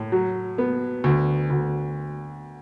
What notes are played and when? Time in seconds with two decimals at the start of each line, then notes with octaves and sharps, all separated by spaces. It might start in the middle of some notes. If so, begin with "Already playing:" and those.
Already playing: A2
0.12 F#3
0.58 B3
1.04 D2
1.50 D2